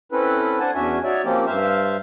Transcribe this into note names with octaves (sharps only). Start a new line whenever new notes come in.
C4 C#4 E4 A4 B4
D4 C5 F#5 G#5 A5
E2 C#4 D4 F#4 E5 G#5
D#4 F#4 C#5 D5 E5
F3 A#3 C4 C#4 G4
G2 C5 E5 F5